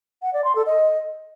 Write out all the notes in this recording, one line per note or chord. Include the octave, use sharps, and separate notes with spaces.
F#5
D5
C6
A4
D#5